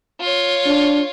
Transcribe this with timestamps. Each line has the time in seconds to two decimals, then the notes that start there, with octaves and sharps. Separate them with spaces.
0.20 F4 C#5
0.66 D4